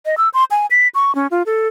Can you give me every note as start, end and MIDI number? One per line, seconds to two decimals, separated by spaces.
0.06 0.15 75
0.18 0.29 88
0.34 0.44 84
0.51 0.66 80
0.71 0.88 95
0.95 1.14 85
1.15 1.27 61
1.31 1.43 65
1.46 1.68 69